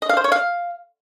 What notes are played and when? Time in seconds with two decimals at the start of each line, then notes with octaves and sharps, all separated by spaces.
0.02 D#5
0.09 F5
0.17 C5
0.24 C#5
0.32 F5